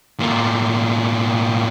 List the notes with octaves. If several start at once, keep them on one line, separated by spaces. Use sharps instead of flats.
A2 A#3